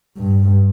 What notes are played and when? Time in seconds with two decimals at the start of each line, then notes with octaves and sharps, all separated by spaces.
0.18 G2